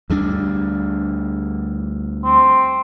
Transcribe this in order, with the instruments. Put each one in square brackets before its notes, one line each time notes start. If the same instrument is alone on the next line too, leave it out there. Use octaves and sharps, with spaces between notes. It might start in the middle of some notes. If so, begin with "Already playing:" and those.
[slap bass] D2 G3 D4
[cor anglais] C4